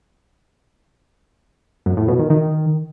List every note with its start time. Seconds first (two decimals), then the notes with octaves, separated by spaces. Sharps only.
1.86 F#2
1.97 A2
2.08 B2
2.19 D#3
2.30 D#3